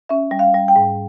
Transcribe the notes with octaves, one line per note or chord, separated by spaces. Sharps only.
C#4 E5
G3
F5
G3
G5
G#2